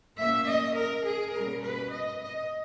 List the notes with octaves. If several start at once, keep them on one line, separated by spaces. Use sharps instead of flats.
A#2 A#3 C#4 E5
D#5
A#4
G#4
B2 G3 A#3 C#4 A#4
B4
D#5
D#5